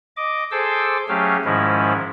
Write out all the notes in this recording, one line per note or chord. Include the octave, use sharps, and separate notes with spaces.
D#5 D6
G#4 A4 C5 C6 D6 E6
F#3 A3 C#4 G4 G#4 F5
G#2 D#3 F3 G#3 C#4 E4